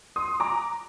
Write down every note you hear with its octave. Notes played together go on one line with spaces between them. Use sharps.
C6 D#6
A#5 D6